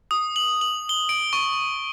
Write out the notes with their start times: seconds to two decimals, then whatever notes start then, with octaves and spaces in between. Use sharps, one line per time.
0.11 D#6
0.36 F#7
0.61 F#7
0.89 G7
1.09 D7
1.33 C#6